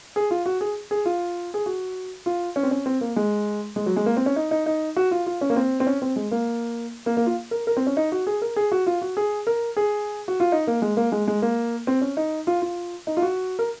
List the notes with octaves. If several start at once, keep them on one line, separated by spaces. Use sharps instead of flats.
G#4
F4
F#4
G#4
G#4
F4
G#4
F#4
F4
C#4
C4
C#4
C4
A#3
G#3
G#3
F#3
G#3
A#3
C4
C#4
D#4
D#4
D#4
F#4
F4
F4
C#4
A#3
C4
C4
C#4
C4
G#3
A#3
A#3
A#3
F4
A#4
A#4
C4
C#4
D#4
F#4
G#4
A#4
G#4
F#4
F4
F#4
G#4
A#4
G#4
F#4
F4
D#4
A#3
G#3
A#3
G#3
G#3
A#3
C4
C#4
D#4
F4
F4
D#4
F4
F#4
A#4